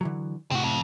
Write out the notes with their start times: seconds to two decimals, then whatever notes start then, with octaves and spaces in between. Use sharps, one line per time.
0.01 D3 E3 F#3
0.51 A2 C3 C4 F#4
0.63 F2